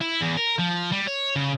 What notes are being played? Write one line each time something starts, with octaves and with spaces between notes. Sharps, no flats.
E4
E2
A#4
F3
G3
C#5
C#3